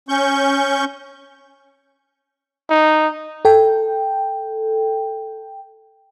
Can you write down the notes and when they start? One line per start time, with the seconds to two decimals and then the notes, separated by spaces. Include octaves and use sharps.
0.09 C#4 C#6 G6
2.70 D#4
3.45 A4 G5